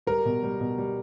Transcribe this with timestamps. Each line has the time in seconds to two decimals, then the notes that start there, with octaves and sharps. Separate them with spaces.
0.07 G3 A#4
0.25 B2
0.43 G3
0.60 B2
0.78 G3